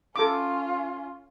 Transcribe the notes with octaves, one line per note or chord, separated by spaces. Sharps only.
C#4 F4 A4 D6